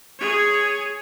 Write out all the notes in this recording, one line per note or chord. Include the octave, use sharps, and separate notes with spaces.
G#4 C#5